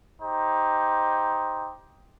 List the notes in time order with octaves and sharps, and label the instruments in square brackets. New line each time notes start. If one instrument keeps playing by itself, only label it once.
[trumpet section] D#4 G4 C5